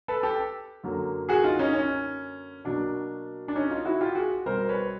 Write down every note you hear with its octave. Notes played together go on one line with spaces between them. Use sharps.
A4 B4
G4 A4
F#2 D3 F#3 A#3
F#4 G#4
D#4 F4
C#4 D#4
C#4
B2 F#3 A#3 D4
D4
C#4 D#4
D#4 F4
E4 F#4
F4 G4
F#4 G#4
B2 G3 C4 A#4 C5
B4 C#5